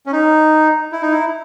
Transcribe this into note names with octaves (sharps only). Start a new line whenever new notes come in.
C#4
D#4
E4
D#4
E4